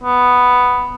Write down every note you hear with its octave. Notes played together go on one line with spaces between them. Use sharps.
B3